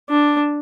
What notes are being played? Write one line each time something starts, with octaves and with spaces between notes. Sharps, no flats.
D4